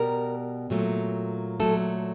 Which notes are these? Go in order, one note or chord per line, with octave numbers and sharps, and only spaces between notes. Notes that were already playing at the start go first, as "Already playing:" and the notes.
Already playing: B2 G3 A#4
A#2 F#3 A3
A#2 F#3 A3 A4